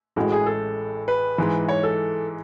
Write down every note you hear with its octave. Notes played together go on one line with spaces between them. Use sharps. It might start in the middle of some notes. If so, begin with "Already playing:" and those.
A1 A2 G#3 F#4
G#4
A4
B4
G#2 E3 G#3
C#5
A4